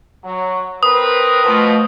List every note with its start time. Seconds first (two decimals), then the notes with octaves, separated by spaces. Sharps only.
0.24 F#3
0.83 C4 A#4 B4 D#6
1.44 B2 F3 A3 B4